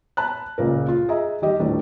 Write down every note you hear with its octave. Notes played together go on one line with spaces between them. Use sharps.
A5 B5 F#6
C#2 A#2 C#3 A#4
F4
G#4 D#5 E5 A#5
D#3 G3 G4 D#5
D#1 A2 D4